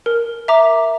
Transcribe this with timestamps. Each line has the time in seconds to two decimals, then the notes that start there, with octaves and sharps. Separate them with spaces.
0.06 A#4
0.48 E5 A#5 D6